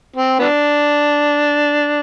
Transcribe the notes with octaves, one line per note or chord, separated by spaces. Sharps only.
C4
B3 D4